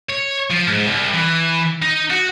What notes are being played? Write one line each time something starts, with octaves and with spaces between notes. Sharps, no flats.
C#5
F3
G#2
C2
E3
D#4
F#4